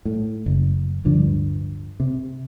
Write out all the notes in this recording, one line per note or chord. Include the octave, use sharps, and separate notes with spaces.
A2
F#1
D1 G2 D3 F3
C3